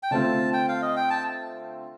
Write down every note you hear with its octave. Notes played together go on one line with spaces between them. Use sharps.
G5
D3 A3 C4 F4 A5
G5
F5
D#5
G5
A5